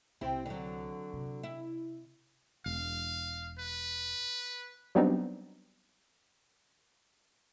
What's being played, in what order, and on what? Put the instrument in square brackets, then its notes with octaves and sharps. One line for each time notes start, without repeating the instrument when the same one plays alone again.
[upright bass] C2 [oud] C4 E4 G4
[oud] D3 F#3
[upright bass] C3
[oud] E4
[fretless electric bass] E1 [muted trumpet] F5
[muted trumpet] B4
[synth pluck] F#3 G3 B3 C4 D4 D#4